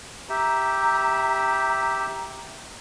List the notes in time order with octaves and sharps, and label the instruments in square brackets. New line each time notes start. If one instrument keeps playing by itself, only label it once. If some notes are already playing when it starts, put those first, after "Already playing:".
[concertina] G4 E5 [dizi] A#5